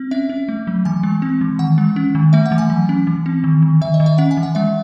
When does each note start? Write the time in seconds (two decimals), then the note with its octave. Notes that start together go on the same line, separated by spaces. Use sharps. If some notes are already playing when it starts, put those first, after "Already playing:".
Already playing: C4
0.11 C#4 E5
0.30 C#4
0.48 A3
0.67 F#3
0.85 E3 G#5
1.03 G#3
1.22 C4
1.41 E3
1.59 D#3 F#5
1.78 G#3
1.96 C#4
2.15 D#3
2.33 A3 E5
2.46 F#5
2.52 E3
2.58 G#5
2.70 F#3
2.89 C#4
3.07 E3
3.26 C4
3.44 D#3
3.62 D#3
3.81 D#3 E5
3.94 D#5
4.00 D#3
4.06 E5
4.18 C#4 F#5
4.31 G#5
4.37 E3
4.43 F#5
4.55 G#3 E5